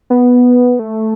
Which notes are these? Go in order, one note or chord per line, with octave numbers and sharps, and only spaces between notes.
B3
A3